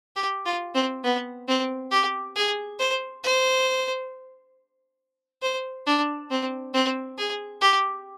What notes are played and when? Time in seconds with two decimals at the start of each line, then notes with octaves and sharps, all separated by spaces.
0.16 G4
0.45 F4
0.75 C4
1.04 B3
1.48 C4
1.91 G4
2.36 G#4
2.79 C5
3.24 C5
5.42 C5
5.87 D4
6.30 C4
6.74 C4
7.18 G#4
7.61 G4